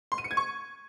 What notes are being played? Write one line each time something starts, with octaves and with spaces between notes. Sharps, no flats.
C6
D#7
C#7
G#6
C#6